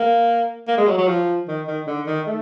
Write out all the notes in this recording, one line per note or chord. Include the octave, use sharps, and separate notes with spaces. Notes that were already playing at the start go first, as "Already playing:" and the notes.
Already playing: A#3
A#3
G#3
F#3
F#3
F3
D#3
D#3
D3
D#3
A3